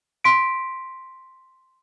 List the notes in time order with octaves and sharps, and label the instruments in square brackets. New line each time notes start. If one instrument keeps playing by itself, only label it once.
[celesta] C6 B6 D7